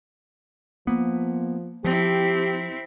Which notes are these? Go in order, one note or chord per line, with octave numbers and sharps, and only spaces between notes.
F3 A#3 B3
F3 C4 E4 G4